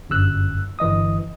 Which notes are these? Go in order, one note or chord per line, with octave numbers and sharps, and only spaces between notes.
G1 F#2 E6 F#6
G1 E3 D#5 D#6